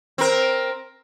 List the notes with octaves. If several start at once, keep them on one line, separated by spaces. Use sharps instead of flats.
C4 A#4